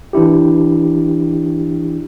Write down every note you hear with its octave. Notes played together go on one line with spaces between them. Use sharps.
E3 D4 E4 G4